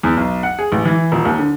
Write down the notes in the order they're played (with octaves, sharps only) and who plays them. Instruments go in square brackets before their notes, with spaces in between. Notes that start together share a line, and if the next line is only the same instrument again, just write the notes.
[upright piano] E2
B1
F#5
G#4
A1
E3
D#1
D#2
D3